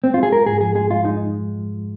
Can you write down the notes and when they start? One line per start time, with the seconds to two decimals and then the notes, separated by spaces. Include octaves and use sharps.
0.04 G#3 C4
0.14 F4
0.18 G#3
0.23 G#4
0.32 F4 A#4
0.46 G#2 G#4
0.61 F3 G#4
0.75 G#3 G#4
0.91 G#3 F4
1.05 G#3 D#4